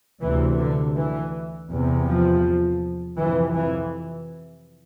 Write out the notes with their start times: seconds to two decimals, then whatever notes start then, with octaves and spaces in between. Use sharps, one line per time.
0.22 D2 C3 E3
0.59 D3
0.95 E3
1.70 E2 C3
2.07 F3
3.18 F2 C3 E3
3.54 E3